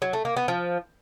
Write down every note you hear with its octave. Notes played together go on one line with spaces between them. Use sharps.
F#3
A3
A#3
B3
F3